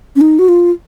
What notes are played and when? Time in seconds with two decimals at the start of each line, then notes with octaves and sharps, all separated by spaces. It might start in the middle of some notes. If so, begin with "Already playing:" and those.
0.16 C#4
0.21 D#4
0.39 F#4
0.48 F4